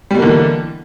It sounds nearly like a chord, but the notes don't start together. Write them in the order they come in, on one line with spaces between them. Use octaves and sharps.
G3 B2 A#3 D3 E3